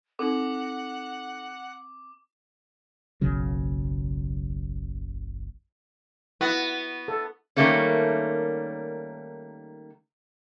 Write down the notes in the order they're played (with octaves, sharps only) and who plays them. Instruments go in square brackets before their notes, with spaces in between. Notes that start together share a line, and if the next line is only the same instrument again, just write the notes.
[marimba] C4 [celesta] D#4 A4 [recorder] F#5 [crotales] D6
[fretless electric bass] F#1 B1 C#3 F#3
[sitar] B3 [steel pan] E4 [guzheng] F#4
[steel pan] A4
[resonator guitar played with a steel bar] D#3 G3 A3 A#3 C#4